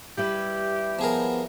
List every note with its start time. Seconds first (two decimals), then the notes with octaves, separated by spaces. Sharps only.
0.17 G3 E4 G4 B4
0.99 F3 B3 G#4 A#4